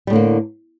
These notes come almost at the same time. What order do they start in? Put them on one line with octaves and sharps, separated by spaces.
G3 A2 D3 A#3